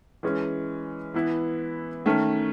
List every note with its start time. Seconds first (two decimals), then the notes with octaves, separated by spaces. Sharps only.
0.23 E3 G#3 C#4
1.14 E3 B3 E4
2.06 D#3 A3 C#4